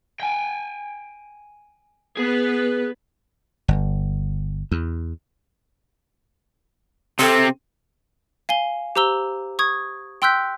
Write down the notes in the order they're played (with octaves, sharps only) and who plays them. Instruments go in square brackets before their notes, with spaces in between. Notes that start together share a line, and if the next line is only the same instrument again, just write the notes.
[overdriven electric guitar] G5 G#5
[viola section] B3 B4 [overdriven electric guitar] G#4
[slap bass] G1
E2
[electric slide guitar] C3 C4 [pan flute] A4
[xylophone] F5 G#5 G7
G4 C5 A#5 E6 G7
C#6 D#6 G#6
G5 C6 E6 F#6 G6 B6